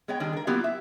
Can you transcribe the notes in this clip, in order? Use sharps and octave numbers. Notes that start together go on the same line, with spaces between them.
G#3 B3 C#5 D#5 G5
D#3 G3 G#3 D4
A4 A#4
F#3 A#3 B3 E4 F4 G4
E5